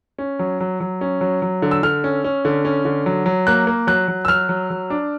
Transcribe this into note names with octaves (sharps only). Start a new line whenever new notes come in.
C#4
F#3
F#3
F#3
C#4
F#3
F#3
D3
E6
D3 F6
C#4
C#4
D3
C#4
D3
F#3
F#3
A#3 F#6
A#3
F#3 F#6
F#3
E6
F#3 F6
F#3
F#3
D4